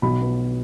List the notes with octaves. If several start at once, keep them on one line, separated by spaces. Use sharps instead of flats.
B1 B5
B3